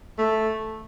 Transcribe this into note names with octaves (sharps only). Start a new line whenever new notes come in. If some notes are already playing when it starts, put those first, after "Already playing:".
A3